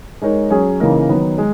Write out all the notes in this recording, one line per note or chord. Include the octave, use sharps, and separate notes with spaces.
G#3 D#4 A#4 C#5
F#3 C#4 G#4
C#3 E3 A#3 D#4 A#4
D#3 F#3 B3
G#3